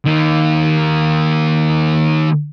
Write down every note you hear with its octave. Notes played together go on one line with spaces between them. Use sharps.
D#3 A#3